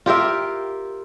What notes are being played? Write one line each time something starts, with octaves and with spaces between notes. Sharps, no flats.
F4 G4 A#4 E5